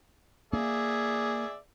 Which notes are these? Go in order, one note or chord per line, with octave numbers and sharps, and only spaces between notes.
A#3 G#4 D5 E5